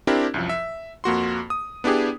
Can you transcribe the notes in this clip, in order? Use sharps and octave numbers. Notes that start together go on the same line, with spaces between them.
C4 D4 E4 G4 A#4
C2 F#2 F3
E5
F2 A#3 F#4 C6
D#6
B3 D4 E4 G4 G#4